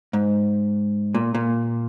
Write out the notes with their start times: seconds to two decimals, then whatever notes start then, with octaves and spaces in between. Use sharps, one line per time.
0.13 G#2
1.14 A#2
1.34 A#2